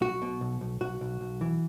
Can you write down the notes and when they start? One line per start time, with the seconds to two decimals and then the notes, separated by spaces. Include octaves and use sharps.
0.01 B1 F#4
0.22 B2
0.41 B1
0.61 B1
0.81 B1 F#4
1.01 B1
1.21 B1
1.41 E3